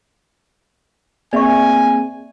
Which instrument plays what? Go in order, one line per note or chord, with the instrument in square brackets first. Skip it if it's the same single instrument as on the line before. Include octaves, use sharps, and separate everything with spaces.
[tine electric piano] A#3 C4 G#4 [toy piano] D5 E5 C#6 [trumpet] G#5